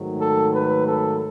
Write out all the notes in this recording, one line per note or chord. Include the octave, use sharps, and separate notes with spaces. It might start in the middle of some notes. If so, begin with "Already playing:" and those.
Already playing: G#2 D#3 F#3 A3
A4
B4
A4